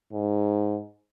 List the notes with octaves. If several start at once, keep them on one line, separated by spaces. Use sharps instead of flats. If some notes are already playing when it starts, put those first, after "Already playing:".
G#2